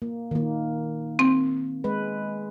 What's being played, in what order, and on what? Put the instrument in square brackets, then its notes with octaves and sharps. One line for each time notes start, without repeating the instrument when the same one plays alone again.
[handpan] A#3
D#3 A#3
[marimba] C4
[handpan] G#3 B4